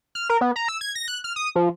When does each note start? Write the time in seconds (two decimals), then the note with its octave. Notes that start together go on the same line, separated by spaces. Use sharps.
0.15 F6
0.30 A#4
0.41 B3
0.56 A#5
0.68 E6
0.81 G#6
0.95 A#6
1.08 F#6
1.24 F6
1.36 D#6
1.55 F3